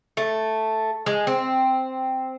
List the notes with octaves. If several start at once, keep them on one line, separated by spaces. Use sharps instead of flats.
A3
G#3
C4